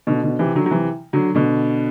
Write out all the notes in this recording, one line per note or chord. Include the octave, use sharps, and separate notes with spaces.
B2 D3
B2 D3
C3 E3
D3 F#3
F#3
C3 E3
D3 F#3
B2 D3